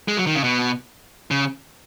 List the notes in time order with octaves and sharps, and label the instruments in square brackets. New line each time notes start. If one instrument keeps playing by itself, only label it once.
[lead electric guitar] G#3
F#3
D#3
C#3
B2
C#3